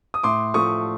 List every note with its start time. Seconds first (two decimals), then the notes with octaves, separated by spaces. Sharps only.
0.14 D#6
0.23 A2 C6 D6
0.54 F3 A3 C#6 D#6